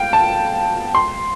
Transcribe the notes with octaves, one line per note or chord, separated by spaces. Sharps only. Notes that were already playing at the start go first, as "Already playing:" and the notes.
Already playing: F5 G5
A5
C6